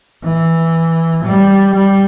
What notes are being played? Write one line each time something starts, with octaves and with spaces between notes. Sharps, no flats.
E3
G3
G3